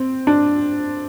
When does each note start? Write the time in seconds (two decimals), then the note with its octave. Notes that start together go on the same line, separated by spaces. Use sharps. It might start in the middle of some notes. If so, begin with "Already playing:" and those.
Already playing: C4
0.27 D4